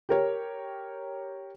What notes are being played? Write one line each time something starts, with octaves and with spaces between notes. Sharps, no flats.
G4 A#4 C#5